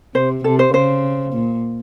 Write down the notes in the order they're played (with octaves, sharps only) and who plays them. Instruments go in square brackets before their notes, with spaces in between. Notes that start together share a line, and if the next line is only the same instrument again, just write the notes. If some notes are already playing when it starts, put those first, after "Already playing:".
[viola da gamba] C3 [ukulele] C5
[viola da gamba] C3 [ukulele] A4
[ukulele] C5
[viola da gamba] C#3 [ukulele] C5
[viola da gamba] A#2